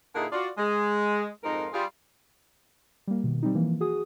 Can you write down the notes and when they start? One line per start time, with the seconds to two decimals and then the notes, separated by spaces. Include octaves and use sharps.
0.15 A#2 D3 D#4 E4 G#4 A#4
0.32 F4 F#4 D5
0.58 G#3
1.44 F2 G#2 D#4 F4 A#4
1.73 G3 F4 G#4
3.07 G3 A#3
3.24 B2 D#3
3.43 G3 C4 D#4
3.55 E3 F3 A#3
3.81 F#4 G#4 D#6